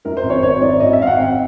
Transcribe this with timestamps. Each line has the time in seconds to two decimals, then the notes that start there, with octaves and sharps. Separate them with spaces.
0.05 F#2 A#4
0.17 C5
0.23 G#1
0.30 C#5
0.42 G#1 C#5
0.61 F#2 D5
0.80 G#1 D#5
0.93 E5
1.00 G#1 F5
1.07 F#5
1.19 G#1 G5